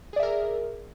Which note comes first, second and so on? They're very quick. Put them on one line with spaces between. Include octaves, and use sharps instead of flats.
G#4 D5 E5 A#4